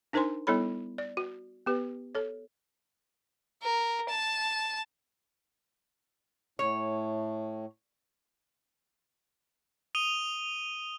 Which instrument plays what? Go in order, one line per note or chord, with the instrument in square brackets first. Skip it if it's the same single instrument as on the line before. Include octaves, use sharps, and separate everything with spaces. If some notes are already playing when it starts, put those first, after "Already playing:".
[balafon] D4 D#4 A#4 C5 G#5 C6
G3 B3 E4 A4 C#5 B5
D5
F#4
B3 G4 B4
A4 C#5
[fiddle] A#4
A5
[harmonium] A2 [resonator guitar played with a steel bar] C#5
[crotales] D#6 D#7 F7 G7